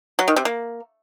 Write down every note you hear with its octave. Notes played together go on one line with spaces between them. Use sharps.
F#3
D#3
C3
A#3